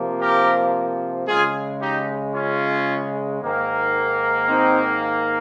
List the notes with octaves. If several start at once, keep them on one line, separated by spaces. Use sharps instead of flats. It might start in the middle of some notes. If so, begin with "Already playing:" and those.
Already playing: C3 F3 A#3
G4 A#4
C#3 G#3 F4 G#4
D#4 G4
C#4 F4
G#2 D#3 A#3
C4 D#4